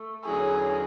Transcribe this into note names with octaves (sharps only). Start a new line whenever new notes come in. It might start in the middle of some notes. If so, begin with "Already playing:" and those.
Already playing: A3
E2 D3 F#3 C#4 E4 G#4